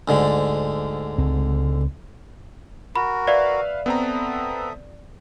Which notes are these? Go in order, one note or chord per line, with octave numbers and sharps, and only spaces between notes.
D2 G#2 D3
C#2 C4
F#4 A#4 B5
B4 D5 E5 F5
B3 C4 A4 E5 A#5 D#6